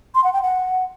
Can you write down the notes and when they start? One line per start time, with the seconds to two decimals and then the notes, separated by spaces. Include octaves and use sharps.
0.15 C6
0.24 F#5
0.33 G5
0.42 F#5